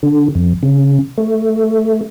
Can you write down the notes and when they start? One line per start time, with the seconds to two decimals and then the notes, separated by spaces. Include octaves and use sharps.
0.03 D3
0.35 F2
0.63 C#3
1.18 A3